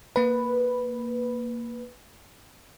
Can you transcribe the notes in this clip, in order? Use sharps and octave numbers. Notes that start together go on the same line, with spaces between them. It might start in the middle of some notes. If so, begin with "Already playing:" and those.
A#3 B4